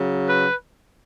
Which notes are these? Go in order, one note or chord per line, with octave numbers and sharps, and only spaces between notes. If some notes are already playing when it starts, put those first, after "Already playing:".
Already playing: C#3 F#3
B4